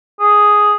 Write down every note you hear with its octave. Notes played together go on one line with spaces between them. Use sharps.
G#4